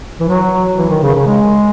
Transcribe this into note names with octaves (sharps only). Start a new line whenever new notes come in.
E3
F#3
E3
D#3
C#3
C#3
G#3